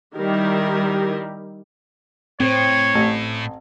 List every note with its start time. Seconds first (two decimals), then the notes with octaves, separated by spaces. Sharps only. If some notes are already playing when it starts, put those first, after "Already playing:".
0.15 D#3 G3 E4 G4 A#4
2.40 A2 C4 C#5
2.95 A1